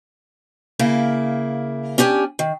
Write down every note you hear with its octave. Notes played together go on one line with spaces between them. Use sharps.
C#3 A#3 E4
C#4 D4 G4 G5 G#5
D#3